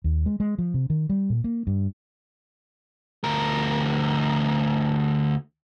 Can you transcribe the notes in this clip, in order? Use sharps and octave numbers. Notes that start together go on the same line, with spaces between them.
D#2
G#3
G#3
F3
C3
D#3
G3
A#2
A#3
G2
D2 A#4